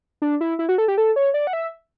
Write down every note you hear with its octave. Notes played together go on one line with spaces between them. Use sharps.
D4
E4
E4
F#4
A4
G4
A4
C#5
D5
F#5
E5